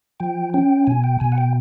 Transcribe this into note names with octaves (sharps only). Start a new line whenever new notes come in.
F3 G5
C#4 G5
B2 G#5
G5
B2 G#5
F#5
G5